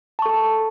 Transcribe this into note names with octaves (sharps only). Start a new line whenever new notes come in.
A4 A5 C#6